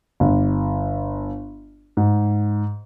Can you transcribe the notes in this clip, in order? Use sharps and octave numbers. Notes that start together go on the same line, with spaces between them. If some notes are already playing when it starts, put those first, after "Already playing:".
G1
G#2